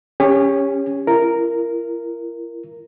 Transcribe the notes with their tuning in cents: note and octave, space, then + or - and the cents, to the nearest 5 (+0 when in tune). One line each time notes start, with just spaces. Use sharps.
C#4 +0 G4 +35
E4 +45 A#4 -5